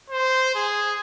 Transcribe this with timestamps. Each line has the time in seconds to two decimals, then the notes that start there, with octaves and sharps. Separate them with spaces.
0.10 C5
0.55 G#4